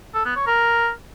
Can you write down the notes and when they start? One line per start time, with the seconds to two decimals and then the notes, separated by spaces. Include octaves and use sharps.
0.14 A4
0.25 B3
0.36 C#5
0.47 A#4